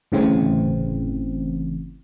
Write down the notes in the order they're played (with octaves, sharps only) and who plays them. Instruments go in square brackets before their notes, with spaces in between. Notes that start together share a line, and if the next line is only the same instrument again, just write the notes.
[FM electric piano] G1 A2 C#3 E3 C4